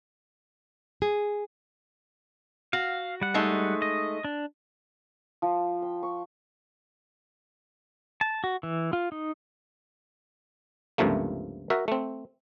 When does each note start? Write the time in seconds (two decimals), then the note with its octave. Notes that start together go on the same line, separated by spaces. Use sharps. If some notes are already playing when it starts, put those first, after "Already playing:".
1.02 G#4
2.73 F#4 F5
3.21 G3 F#5
3.34 G#3 A3 D#4
3.82 D#5
4.24 D4
5.42 F3
5.82 G5
6.03 C#6
8.21 A5
8.44 F#4
8.63 E3
8.93 F4
9.12 D#4
10.98 C#2 G2 C3 F3 A3 A#3
11.70 F#4 A#4 E5
11.88 A3 C4